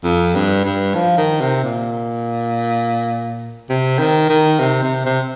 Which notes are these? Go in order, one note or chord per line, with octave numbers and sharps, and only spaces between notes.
F2
G2
G2
F3
D#3
C3
A#2
C3
D#3
D#3
C3
C3
C3